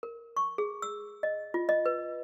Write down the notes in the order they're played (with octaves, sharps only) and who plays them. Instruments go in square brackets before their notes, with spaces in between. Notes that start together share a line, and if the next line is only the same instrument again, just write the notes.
[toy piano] A#4
C#6
G#4
E6
D#5
F4
D#5
B4